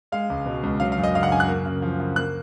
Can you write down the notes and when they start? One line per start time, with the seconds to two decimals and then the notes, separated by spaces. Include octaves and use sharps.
0.12 G#3 F5
0.30 C#2
0.46 B2
0.63 C#2
0.80 F#3 F5
0.92 F5
0.98 F#2
1.03 D#5
1.15 C#3 F5
1.23 F#5
1.32 F#2 G#5
1.40 F#6
1.48 A#3
1.66 C#3
1.82 F3
2.00 C#3
2.16 A#3 F#6